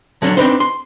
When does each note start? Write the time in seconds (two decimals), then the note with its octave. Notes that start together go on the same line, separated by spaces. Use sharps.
0.22 D3 F#3 C#4 D4
0.37 C4 D4 D#4 B4 C5
0.60 C6